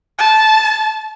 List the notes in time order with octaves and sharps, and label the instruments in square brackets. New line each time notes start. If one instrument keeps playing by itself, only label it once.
[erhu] A5